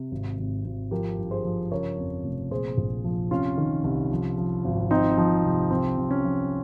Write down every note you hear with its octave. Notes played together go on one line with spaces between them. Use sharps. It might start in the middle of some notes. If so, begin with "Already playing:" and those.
Already playing: C3
G#1
G#1
G#1
F3 G4 A#4
G2
G#4 C5
F3
C#3 A#4 C#5
F2
F1
A#2 G#4 C5
A#1
F3
C3 C#4 F4
D#3
C2
F3
F3
G#1
F3 C4 D#4
F3
C2
C2 C4
C2
C#4
F3